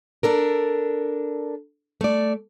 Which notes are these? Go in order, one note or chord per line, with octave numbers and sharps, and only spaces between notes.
D4 A4 A#4
A3 D5